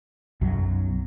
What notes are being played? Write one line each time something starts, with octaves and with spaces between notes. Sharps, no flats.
B1 F#2 F#3